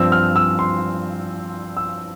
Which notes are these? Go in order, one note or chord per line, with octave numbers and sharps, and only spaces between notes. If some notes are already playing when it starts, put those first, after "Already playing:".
Already playing: G2 F3 C4 E6
F6
E6
C6
E6